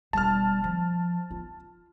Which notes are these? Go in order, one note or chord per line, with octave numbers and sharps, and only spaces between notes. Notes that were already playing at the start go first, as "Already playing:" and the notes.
E1 G3 A5 F6
F3
F4